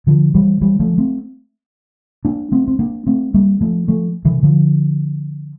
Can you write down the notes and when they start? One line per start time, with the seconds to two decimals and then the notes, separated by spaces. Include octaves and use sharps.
0.07 D3 F3
0.35 E3 G3
0.61 E3 G3
0.80 F3 A3
0.98 A3 C4
2.25 A#3 D4
2.52 A3 C4
2.68 C4
2.79 A#3 D4
3.07 A3 C4
3.34 G3 A#3
3.61 F3 A3
3.88 F3 A3
4.25 C3 E3
4.43 D3 F3